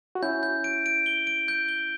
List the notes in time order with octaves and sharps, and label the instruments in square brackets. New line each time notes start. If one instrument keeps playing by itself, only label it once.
[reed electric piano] F#4
[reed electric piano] C#4 E4 [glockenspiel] G6
[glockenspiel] G6
D7
D7
G7
D7
G6
G7